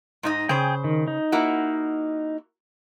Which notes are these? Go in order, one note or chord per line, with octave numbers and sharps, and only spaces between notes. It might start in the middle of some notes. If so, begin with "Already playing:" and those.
G#2 D#4 D#5
C#3 G#4 C5 G5
D#3
D#4
A#3 E4 F#4